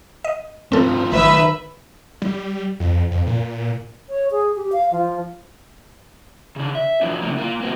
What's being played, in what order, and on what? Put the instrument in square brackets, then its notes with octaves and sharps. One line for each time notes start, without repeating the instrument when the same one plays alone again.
[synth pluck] D#5
[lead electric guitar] G2 F3 [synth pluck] C4 A4
[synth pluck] A1 [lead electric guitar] D#3 F#3 [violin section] B4 E5
[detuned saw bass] G3
F2
F2
A#2
[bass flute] C#5
G#4
G4
F5
F3
[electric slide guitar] C#3 D4
E5
F3 F#3 D4
C#3 F3 A3 A#3
A#3 F4
A#3 C4 F#4